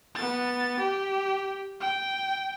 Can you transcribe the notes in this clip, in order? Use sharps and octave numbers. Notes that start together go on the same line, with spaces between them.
B3 A6
G4
G5